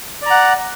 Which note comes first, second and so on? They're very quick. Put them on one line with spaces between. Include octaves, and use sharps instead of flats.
D5 A#5 F#5